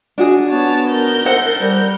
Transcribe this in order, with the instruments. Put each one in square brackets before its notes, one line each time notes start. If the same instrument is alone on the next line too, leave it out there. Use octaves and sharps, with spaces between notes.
[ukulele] D4 F#4 G#4
[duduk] B3 [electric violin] C#5 A5
[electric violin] A#4 G6
[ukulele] A4 C5 F#5
[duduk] G3